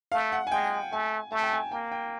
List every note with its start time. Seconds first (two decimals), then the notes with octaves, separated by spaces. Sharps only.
0.12 A3 F5
0.32 F#5
0.47 G#5
0.52 G#3 G5
0.92 A3 G#5
1.32 A3 A5
1.43 G5
1.53 G#5
1.72 A#3 G5
1.92 G5